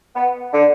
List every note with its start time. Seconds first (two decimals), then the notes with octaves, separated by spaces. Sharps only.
0.15 B3
0.53 D3